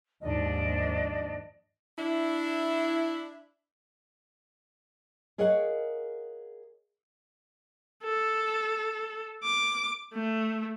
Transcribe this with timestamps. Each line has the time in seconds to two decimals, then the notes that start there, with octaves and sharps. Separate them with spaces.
0.22 D#2 G#2 F3 D4 D5 D#5
1.98 D4 E4
5.38 G#4 A#4 C#5 D#5 F5 F#5
8.04 A4
9.44 D6
10.13 A3